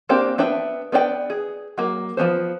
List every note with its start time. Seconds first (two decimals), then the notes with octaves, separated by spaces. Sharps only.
0.09 A#3 C4 D4 G4
0.38 B3 D4 E5 G5
0.92 B3 D4 D5 G5
1.30 G#4
1.78 F#3 A#3
2.17 F3 G#3 B3 C5